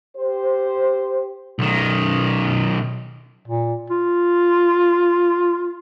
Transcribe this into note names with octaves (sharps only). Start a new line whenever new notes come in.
G4 C5
B1 D#3
A#2
F4